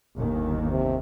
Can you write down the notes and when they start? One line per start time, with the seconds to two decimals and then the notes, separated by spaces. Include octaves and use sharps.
0.15 G1 D#2 D#3
0.71 C3